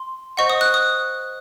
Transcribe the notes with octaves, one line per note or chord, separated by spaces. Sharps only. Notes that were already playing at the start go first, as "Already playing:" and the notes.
Already playing: C6
C5 D#5 F#5 C#6
D#6
F#6
D#6